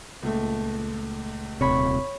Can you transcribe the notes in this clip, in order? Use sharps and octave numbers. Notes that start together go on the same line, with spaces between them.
C#2 A#2 A3
D#1 C3 C#5 B5